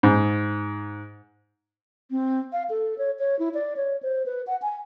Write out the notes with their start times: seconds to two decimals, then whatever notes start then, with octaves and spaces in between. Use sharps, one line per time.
0.03 G#2
2.11 C4
2.53 F5
2.70 A4
2.98 C#5
3.19 C#5
3.39 E4
3.54 D5
3.77 C#5
4.03 C5
4.26 B4
4.47 F#5
4.62 G#5